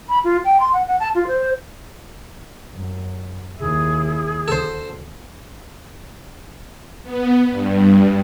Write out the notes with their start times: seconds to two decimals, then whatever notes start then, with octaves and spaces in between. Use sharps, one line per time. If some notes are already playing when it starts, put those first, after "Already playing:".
0.09 B5
0.24 F4
0.45 G5
0.60 C6
0.73 F#5
0.87 F#5
1.00 A5
1.15 F4
1.28 C5
2.73 F#2
3.59 D#2 E4 G#4
4.48 D2 A4 C5
7.03 B3
7.47 G2